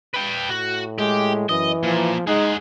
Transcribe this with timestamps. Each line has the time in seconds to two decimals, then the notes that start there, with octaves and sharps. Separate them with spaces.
0.14 B4 G5
0.49 A2 F#4
0.98 G#3 G4
1.49 F#2 E3 D#5
1.83 A#2 F3
2.27 G#3 D#4 G#4 F#5